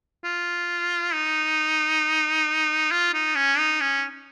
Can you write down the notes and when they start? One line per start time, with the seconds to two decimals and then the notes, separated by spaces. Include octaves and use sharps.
0.24 F4
1.14 D#4
2.91 F4
3.14 D#4
3.35 C#4
3.58 D#4
3.81 C#4